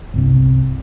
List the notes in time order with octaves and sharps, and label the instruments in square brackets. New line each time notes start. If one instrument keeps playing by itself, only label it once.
[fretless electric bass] G1 C2 C3